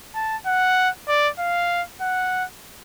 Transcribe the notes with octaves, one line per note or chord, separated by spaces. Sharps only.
A5
F#5
D5
F5
F#5